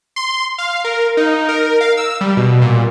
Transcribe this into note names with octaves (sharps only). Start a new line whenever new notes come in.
C6
F5
A#4
D#4
A#4
F5
E6
G3
B2
A#2